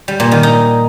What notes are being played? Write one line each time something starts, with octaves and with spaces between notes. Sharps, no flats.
G3
A#2
D#3
D#4